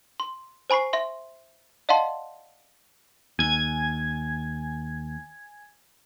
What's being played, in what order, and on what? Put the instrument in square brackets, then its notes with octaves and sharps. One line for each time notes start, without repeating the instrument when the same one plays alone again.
[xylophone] C6
C5 G#5 B5 C#6 C7
E5 C6
D5 D#5 F5 F#5 A5 C6
[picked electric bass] D#2 [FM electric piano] G#5 G#6